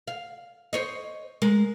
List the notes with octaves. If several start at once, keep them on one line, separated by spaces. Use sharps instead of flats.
F5
C5 C#5 D#5
G#3 A#4